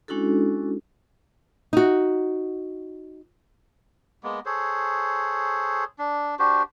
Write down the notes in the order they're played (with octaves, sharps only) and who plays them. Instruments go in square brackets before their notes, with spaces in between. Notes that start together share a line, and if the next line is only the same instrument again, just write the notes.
[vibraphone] G#3 C#4 D4 E4 F#4 A4
[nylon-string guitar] D#4 F#4
[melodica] G#3 A#3 B3
G#4 A4 C5 C#5
D4
D4 F#4 G4 C5